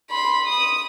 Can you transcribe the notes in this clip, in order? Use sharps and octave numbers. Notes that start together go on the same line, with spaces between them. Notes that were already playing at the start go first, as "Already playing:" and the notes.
B5 C6
D#6